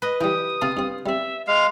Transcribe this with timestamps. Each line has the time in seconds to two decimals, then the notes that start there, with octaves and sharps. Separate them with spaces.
0.02 B4 D#5
0.21 E3 G3 G4 D#6
0.62 C3 F4 F5 A5
0.77 G2 C4
1.06 G3 C4 E5
1.47 G#3 F5 F7